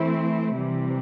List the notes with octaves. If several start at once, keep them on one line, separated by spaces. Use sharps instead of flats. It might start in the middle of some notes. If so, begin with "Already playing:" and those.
Already playing: E3 A3 C4 E4
C3 E3 G3